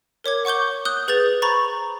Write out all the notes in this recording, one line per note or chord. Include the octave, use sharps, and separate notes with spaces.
A#4 C#5 D6 G#6
F#5 C#6 D6 G6 G7
D#6 F#6 G6 G7
G#4 B4 G6 A6 F7
C5 A#5 B5 C#6 A6